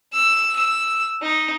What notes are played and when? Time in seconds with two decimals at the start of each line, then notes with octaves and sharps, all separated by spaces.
0.13 E6
0.56 E6
1.22 D#4